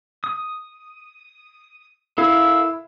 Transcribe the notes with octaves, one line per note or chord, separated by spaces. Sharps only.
D#6
E4 A4 A#4 F5 E6